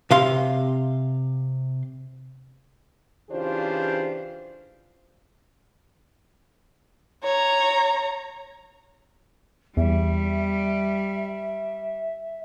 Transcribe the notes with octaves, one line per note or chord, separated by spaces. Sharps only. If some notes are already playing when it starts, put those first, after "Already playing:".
C3 F5 C6
C#3 E3 D4 F4 G4 C5
C#5 A#5
E2 G3 E5